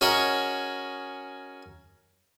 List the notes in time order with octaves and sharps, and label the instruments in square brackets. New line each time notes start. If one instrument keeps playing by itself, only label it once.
[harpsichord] C#4 F#4 G#4 A#4 C#5 D#5